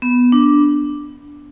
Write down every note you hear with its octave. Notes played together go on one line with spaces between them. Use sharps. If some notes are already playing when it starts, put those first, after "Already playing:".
B3
D4